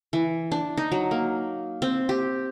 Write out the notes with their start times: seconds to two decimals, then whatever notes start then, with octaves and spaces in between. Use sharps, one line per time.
0.13 E3
0.52 D4
0.77 D#4
0.92 F#3
1.11 A#3
1.82 C4
2.09 G4